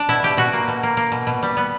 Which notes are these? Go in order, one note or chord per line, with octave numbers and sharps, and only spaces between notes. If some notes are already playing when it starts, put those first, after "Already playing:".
Already playing: D4
B2 E4
B2 G4
B2 F#4
A#3
B2
A#3
A#3
B2
B2
G3
B3